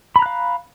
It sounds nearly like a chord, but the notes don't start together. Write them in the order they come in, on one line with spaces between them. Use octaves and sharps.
B5 A#5 F#6 F5